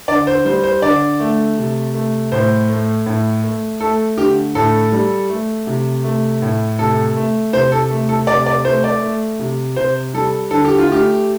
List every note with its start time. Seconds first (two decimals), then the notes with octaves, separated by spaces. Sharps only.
0.08 D3 D5
0.27 C5
0.45 G3 C5
0.63 C5
0.82 D3 D5
1.20 A3
1.58 C3
1.94 A3
2.32 A2 C5
2.69 A3
3.06 A2
3.44 A3
3.80 A3 A4
4.17 D3 G4
4.55 A2 A4
4.92 G3
5.29 A3
5.67 C3
6.04 A3
6.42 A2
6.78 C3 A4
7.16 A3
7.53 C3 C5
7.72 A4
7.91 A3
8.09 A4
8.27 C3 D5
8.46 D5
8.64 A3 C5
8.84 D5
9.02 A3
9.39 C3
9.76 C3 C5
10.14 G3 A4
10.51 D3 A4
10.65 G4
10.78 F4
10.88 A3 G4